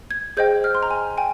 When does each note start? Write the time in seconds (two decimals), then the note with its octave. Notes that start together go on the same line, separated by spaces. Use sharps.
0.11 G#6
0.37 G#4 C5 D#5 G5 G6
0.64 F6
0.75 C6
0.83 A#5
0.91 G#5
1.17 G5 G#5